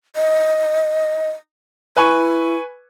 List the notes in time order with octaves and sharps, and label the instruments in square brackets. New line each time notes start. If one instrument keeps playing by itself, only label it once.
[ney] D#5
[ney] E4 [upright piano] B4 G#5 C#6